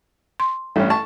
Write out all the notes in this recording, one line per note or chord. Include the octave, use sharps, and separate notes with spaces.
C6
A1 G2 C#4 A4
A5 C#6